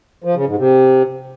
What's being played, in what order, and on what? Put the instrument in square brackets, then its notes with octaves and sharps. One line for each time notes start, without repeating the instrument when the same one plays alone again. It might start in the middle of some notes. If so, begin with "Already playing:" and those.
[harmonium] F3
C#3
G#2
C3